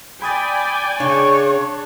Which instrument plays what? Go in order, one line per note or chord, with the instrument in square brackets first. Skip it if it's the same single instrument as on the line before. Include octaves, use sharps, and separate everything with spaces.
[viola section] D5 G5 G#5 [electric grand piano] B5 D#6 A6
[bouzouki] C#3 [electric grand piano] D4 [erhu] C#5